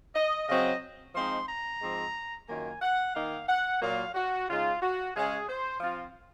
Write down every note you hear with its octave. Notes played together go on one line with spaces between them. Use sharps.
D#5
C#3 F#3 C4 D#5
F3 G#3 C4 D#4 C6
A#5
G#2 F3 C4
F#2 D#3 A#3 F4 G#5
F#5
D#3 A#3 D#4 F5
F#5
A#2 F#3 A#3 F4 F5
F#4
C#3 G#3 D#4 F4
F#4
C#3 G#3 C#4 G#4
C5
F3 C4 F4